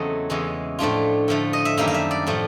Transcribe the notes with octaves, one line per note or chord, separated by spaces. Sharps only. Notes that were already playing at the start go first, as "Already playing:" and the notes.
Already playing: E2 C#3 F#3 A3 C4 D#5
E2 C#3 E3 G#3
A2 F3 A3 D4 F4
D3 F3 A3
D#5
E5
F#2 D#3 G3 A#3 D4 F5
F5
E5
D5
A2 F3 A3 D4